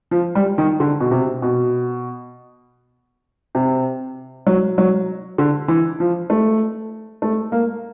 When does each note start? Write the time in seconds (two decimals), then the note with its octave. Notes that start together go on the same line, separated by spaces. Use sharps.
0.11 F3
0.35 G3
0.58 D#3
0.80 D3
1.01 B2
1.11 C3
1.42 B2
3.55 C3
4.47 F#3
4.78 F#3
5.38 D3
5.68 E3
6.00 F3
6.30 A3
7.22 A3
7.52 A#3